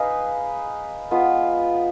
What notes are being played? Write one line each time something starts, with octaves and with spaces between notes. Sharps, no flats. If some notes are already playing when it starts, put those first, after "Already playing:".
Already playing: D#4 G#4 B4 F5
G#3 B3 F4 B4